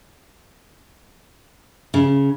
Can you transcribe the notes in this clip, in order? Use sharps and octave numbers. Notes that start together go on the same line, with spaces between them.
C#3